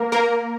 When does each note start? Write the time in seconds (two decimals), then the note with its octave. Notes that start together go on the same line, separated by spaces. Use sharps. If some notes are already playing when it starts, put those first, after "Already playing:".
Already playing: A#3 A#4
0.12 A#3 A#4